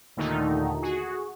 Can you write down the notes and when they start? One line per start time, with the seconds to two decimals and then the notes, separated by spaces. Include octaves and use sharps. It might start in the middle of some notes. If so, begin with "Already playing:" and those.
0.17 D#2 A#2 D3 D#3 A3 D#4
0.82 F#4 G#4